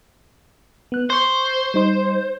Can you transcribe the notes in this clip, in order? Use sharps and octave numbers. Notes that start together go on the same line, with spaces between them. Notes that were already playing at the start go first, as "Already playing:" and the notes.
B3 F#6
C5 C6 C#6
G3 D#4 C6